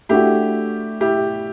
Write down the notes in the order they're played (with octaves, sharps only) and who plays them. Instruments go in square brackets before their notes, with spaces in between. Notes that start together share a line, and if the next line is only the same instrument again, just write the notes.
[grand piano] A3 D4 F#4 [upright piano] E4 G4
[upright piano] E4 G4